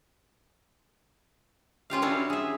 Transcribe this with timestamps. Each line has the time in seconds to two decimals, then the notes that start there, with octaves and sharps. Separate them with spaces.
1.90 C#4 F4 G4 F5
2.02 C#4 D4 E4 F#4 C#5
2.30 G#4 E5